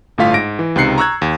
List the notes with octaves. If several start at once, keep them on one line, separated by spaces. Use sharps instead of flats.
G1 A2 A3 F4 F5 B6
G#2 A#6 D7
E3
C#2 C3 D#4 F#6 C7 C#7
A#5 C#6 E6 F#6 G#6
D#2